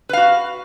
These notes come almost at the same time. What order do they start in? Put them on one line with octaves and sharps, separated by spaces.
B4 F5 F#4